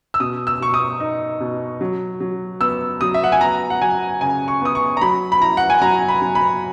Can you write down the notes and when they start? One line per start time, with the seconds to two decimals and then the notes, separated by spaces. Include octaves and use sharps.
0.14 E6
0.20 B2 D#6
0.47 E6
0.60 B2 C#6
0.74 D#6
1.00 D#4
1.40 B2
1.81 F#3
2.20 F#3
2.61 B3 E6
3.01 F#3 D#6
3.14 E5
3.24 F#5
3.32 G#5
3.41 B3 A#5
3.70 F#5
3.81 F#3 G#5
4.21 C#3 G#5
4.48 C#6
4.61 B3 D#6
4.75 C#6
4.97 A#5
5.01 F#3 B5
5.32 B5
5.42 E4 A#5
5.57 F#5
5.70 G#5
5.82 F#3 A#5
6.08 B5
6.22 F#3
6.35 B5